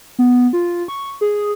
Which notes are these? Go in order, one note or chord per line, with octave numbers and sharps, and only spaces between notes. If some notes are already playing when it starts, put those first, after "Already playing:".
B3
F4
C#6
G#4